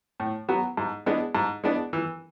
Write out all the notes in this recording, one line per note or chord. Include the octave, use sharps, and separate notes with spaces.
A2
F#3 B3 F#4
G#2
G#3 B3 D4
G#2
G#3 B3 D4
E3